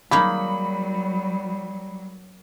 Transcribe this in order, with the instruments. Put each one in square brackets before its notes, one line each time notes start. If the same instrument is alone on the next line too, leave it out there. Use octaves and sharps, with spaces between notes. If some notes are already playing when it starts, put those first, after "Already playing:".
[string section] F#3 [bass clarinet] G3 [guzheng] A#3 D#4 G#4 [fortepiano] B5